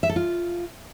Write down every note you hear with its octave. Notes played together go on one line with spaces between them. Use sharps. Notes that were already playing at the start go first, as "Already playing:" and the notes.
E5
A4
F4